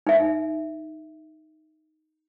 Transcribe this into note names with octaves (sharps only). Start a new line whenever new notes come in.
D#4 E5